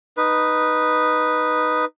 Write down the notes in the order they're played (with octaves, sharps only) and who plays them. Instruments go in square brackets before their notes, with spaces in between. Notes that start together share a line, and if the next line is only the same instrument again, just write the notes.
[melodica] D#4 B4